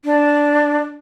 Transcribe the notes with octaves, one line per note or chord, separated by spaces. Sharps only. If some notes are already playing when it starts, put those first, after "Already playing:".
D4